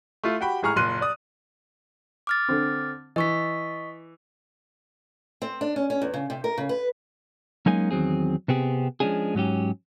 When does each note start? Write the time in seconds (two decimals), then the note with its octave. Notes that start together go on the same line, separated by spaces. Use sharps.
0.23 A3 E4 F4
0.41 F#4 G4 G5 B5
0.63 G#1 A2 G#4 A#5 C#6 F6
0.76 F#1 A#2 C6 F#6 D#7
1.01 D5 D#6
2.27 D6 F6 A6
2.49 D3 C4
3.16 E3 D#5 C#6 B6
5.42 C4
5.61 D4
5.76 C#4
5.90 C#4
6.02 E2
6.14 C#3
6.30 C3
6.44 A#4
6.57 C#3
6.69 B4
7.66 F#3 G#3 A#3 C#4 D#4 G#5
7.91 E2 D#3 F#3 C4 G#4
8.48 C3 B3 C4 G4 G#4
9.00 F3 F#3 G#3 C#4 D4 G#4
9.35 G#2 F#3 C#4 G4